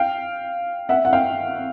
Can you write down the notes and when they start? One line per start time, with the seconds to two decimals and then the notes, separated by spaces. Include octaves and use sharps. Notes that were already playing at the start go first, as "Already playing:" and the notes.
Already playing: F5 G5
0.89 E5 F#5
1.05 F#5
1.13 F5 G5